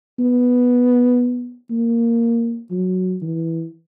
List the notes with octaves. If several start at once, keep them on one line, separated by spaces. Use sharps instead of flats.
B3
A#3
F#3
E3